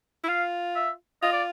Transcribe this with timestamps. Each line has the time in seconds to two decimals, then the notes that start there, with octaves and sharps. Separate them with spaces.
0.24 E4
0.28 F4 F5
0.76 E5
1.22 F4 D#5
1.32 D5